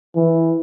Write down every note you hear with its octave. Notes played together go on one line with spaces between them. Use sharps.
E3